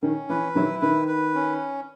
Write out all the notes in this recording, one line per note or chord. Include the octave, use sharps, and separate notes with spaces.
D#3 C#4
E3 B4
D#3 F#3 E4
D#3 B4
B4
C#4